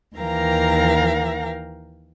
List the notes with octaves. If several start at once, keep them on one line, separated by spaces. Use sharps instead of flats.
D#2 E3 A#4 F5 G5 A#5